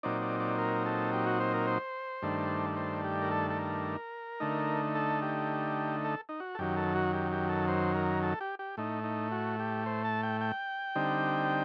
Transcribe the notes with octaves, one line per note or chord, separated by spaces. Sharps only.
A#2 F#3 C4 D#4 D5
D5
D5
A#4
A4
G4
F#4
C5
A#4
C5
G2 D#3 A3 D4
C5
G4
A#4
A4
A4
A#4
D3 A3 D#4
A4
G4
A4
D#4
F#4
A4
F#2 D#3 F#3 G4
A4
F#4
G4
G4
A4
C5
A#4
A4
G4
G4
A2 A3 D#4
D#4
F#4
G4
C5
A5
G5
G5
D3 G3 C4 D#4